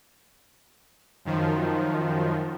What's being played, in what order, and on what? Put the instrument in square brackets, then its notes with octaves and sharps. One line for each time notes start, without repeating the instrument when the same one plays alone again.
[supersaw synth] F#2 D#3 F3